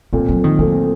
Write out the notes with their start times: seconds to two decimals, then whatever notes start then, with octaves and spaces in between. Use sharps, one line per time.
0.13 A#2 A3 A#3 C4
0.29 F#3
0.44 D#3
0.59 A#2 F#3 A3 C4